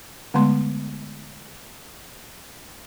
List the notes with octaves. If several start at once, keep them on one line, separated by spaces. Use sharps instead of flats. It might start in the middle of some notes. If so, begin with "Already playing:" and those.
D3 G#3 A3 B3 C6